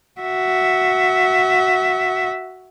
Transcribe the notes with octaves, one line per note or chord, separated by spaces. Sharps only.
F#4 E5